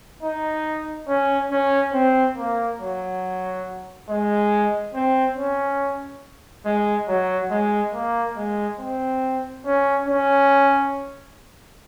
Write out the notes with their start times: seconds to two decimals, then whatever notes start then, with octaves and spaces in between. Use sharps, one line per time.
0.23 D#4
1.08 C#4
1.52 C#4
1.94 C4
2.37 A#3
2.80 F#3
4.09 G#3
4.95 C4
5.37 C#4
6.65 G#3
7.08 F#3
7.51 G#3
7.94 A#3
8.37 G#3
8.79 C4
9.66 C#4
10.08 C#4